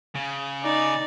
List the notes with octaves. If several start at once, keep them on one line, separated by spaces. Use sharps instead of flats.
C#3
D#4 D5